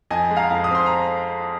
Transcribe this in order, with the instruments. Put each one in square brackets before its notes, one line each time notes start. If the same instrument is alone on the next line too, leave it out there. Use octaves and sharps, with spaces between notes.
[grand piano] F2 D#5 G#5
G#3
F5 A#5
F2
D#6
C4 C6
A#5